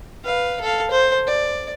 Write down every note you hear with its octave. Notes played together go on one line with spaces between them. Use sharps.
B4 F5
A4 F5
C5
D5